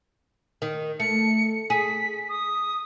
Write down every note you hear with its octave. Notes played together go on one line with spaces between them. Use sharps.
D#3
A3 C#7
G#4 B6
D#6